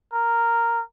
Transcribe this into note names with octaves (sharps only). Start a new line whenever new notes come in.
A#4